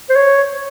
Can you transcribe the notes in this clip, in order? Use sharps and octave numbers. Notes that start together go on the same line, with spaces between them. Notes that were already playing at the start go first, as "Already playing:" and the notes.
C5
C#5